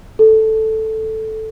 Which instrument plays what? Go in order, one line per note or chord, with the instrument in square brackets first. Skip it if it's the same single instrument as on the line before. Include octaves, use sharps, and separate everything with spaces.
[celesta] A4